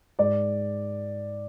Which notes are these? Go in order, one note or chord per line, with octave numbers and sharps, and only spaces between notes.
G#2 D5